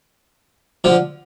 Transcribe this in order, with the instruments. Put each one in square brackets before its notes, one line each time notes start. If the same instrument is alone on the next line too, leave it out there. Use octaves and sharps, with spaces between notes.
[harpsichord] D3 F3